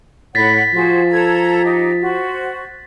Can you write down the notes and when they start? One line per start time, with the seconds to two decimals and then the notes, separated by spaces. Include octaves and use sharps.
0.35 A2 C#5 F#5 B5 A6 B6
0.74 F3 F#4 G#4 C5
1.11 A4 A#5 G#6
1.64 D#4 G4
2.01 F#4 C5